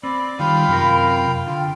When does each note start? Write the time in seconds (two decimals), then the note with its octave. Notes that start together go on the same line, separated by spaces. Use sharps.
0.03 C4 D5 B5
0.39 D#3 G3 F4 F5 G5 B5
0.68 F#2 C3 A#4
1.47 D3 F4 G5